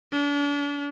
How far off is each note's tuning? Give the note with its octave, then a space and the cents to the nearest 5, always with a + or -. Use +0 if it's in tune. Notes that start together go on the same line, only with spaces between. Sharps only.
D4 -40